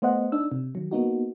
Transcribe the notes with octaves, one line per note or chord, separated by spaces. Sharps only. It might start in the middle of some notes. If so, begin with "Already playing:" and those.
A3 B3 C5 D#5 F#5
D4 D#4 E6
C3
D#3 F#3
A#3 B3 D#4 F#4